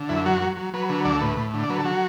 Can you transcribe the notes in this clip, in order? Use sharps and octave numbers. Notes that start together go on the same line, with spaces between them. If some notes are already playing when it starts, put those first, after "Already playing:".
Already playing: D3
F#2 E4
F#3 F#4
F#3
F#3
F#3 B4
D3 B4
D2 D5
A4
A2 B4
A2
D3
D5
F#3 B4
A4
F#3 F#4